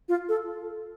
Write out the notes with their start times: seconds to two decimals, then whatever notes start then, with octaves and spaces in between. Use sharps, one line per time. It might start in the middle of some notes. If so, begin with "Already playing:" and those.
0.09 F4
0.29 A4